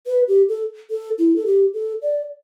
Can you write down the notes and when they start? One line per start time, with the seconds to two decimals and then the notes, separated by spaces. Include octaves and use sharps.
0.07 B4
0.28 G4
0.49 A4
0.90 A4
1.19 E4
1.36 A4
1.46 G4
1.74 A4
2.02 D5